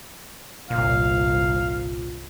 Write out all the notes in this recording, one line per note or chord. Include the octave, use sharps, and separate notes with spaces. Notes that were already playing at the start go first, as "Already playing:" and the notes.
G1 C2 A#2 F5